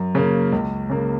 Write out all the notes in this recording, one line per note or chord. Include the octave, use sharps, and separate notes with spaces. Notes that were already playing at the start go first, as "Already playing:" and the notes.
Already playing: F#2
C#3 A#3
C#2
C#3 A#3